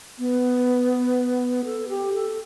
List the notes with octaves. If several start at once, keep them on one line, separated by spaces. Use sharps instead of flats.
B3
A4
G4
A4